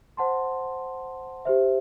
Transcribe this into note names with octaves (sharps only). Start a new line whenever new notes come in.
C5 F#5 A5 C6
G4 C5 E5